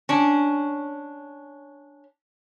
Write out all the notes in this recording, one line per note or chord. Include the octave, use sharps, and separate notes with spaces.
C#4 D4